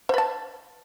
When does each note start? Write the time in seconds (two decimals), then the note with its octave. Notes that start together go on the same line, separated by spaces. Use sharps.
0.09 C5
0.14 B4
0.18 A5